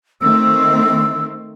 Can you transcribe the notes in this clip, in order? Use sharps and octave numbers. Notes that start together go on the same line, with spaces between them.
D#3 A3 C4 E6